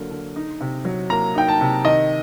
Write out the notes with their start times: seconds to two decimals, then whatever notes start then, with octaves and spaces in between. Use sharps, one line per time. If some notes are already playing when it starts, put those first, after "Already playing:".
Already playing: D3 F#3 A#3
0.10 D3
0.36 D#4
0.61 C3
0.85 F#3
1.10 A#3 A#5
1.35 D#4 G5
1.48 A5
1.61 C3
1.85 D#3 D#5